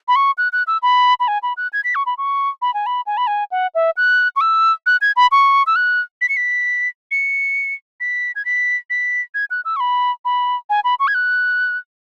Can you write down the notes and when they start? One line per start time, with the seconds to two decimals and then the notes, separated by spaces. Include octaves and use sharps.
0.08 B5
0.16 C#6
0.38 F#6
0.53 F#6
0.67 E6
0.83 B5
1.20 B5
1.28 G#5
1.43 B5
1.57 F#6
1.73 G#6
1.84 B6
1.95 C#6
2.06 B5
2.18 C#6
2.62 B5
2.74 G#5
2.86 B5
3.06 G#5
3.17 B5
3.27 G#5
3.51 F#5
3.75 E5
3.97 F#6
4.36 C#6
4.41 E6
4.86 F#6
5.01 G#6
5.16 B5
5.31 C#6
5.67 E6
5.76 F#6
6.21 B6
6.29 C#7
6.37 B6
7.11 C#7
8.00 B6
8.36 G#6
8.45 B6
8.90 B6
9.34 G#6
9.50 F#6
9.65 E6
9.76 C#6
9.80 B5
10.25 B5
10.70 G#5
10.84 B5
10.99 C#6
11.08 G#6
11.14 F#6